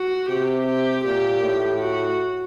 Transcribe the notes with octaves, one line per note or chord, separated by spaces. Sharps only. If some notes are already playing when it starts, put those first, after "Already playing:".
Already playing: F#4
C3 G4
G4
A#2 G4
A2
F#4